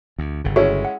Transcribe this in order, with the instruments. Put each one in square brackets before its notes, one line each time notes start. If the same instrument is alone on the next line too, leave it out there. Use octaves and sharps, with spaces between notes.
[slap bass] D2
G1 C#3
[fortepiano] G#3 C#4 E4 [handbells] F#4 A4 C#5
[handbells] F#5